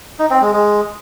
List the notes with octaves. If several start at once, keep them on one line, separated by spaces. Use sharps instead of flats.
D#4
C4
G#3
G#3